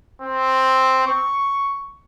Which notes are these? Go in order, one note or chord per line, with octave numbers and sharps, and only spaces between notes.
C4
C#6